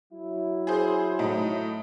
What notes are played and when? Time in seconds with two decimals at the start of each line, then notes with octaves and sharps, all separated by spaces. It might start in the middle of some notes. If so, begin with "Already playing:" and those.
0.12 F#3 E4
0.67 G#4 C5
1.19 A2 D#4